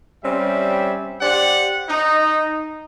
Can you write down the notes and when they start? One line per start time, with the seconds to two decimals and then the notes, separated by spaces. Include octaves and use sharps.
0.24 G3 C4 C#4 E5
1.21 G4 C5 D5 F#5
1.89 D#4